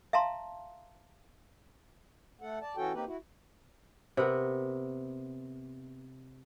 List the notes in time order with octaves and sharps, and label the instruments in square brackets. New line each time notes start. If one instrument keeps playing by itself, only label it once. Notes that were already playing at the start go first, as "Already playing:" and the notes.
[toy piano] E5 F5 A5 A#5 C6
[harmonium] A3 A4 F#5
D5 A5
E3 C#4 F#4 A4 G5
A#3 C4 D#4 G4 B4
E4 F#4
[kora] C3 B3 A#4